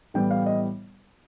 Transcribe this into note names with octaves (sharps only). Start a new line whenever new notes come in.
A2 E3 G3 B3 G5
F5
D#5